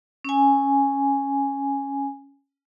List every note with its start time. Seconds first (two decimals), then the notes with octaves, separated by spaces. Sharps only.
0.25 C#4 G#5